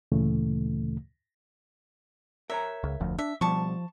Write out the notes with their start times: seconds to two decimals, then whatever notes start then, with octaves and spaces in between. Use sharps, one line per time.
0.12 D2 A#2 C#3 E3 A3
2.50 A#4 C#5 E5 A#5
2.84 C#2
3.00 F1 D2 F3
3.19 D4 E5
3.41 B2 F3 G3 A5 C#6